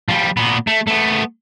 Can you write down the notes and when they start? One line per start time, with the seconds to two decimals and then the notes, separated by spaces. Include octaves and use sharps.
0.09 F3 G3
0.37 A#2 B3
0.67 A3
0.88 A3 B3